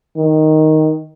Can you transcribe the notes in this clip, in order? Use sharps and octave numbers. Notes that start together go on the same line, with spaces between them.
D#3